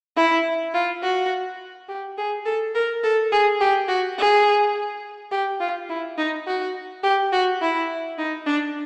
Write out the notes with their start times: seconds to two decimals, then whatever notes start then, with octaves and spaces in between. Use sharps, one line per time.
0.16 E4
0.74 F4
1.03 F#4
1.89 G4
2.18 G#4
2.46 A4
2.75 A#4
3.04 A4
3.32 G#4
3.60 G4
3.89 F#4
4.18 G#4
5.31 G4
5.60 F4
5.89 E4
6.18 D#4
6.47 F#4
7.04 G4
7.32 F#4
7.61 E4
8.18 D#4
8.46 D4